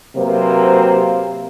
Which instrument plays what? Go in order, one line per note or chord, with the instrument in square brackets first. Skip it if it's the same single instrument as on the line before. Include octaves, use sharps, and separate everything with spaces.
[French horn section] C3 F#3 A#3 B4 C5